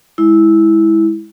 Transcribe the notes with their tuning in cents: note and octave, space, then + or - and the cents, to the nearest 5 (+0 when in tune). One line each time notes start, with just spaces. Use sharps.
G#3 +0 E4 -10